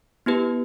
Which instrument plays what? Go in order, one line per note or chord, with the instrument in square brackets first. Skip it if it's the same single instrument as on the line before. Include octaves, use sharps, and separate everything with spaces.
[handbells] B3 E4 G4 B4